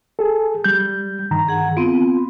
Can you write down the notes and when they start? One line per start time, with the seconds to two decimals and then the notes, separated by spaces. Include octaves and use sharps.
0.19 G#4 A4
0.64 G3 G6
1.31 G2 D#3 A#5
1.48 G#4 F#5
1.77 B3 C4 F4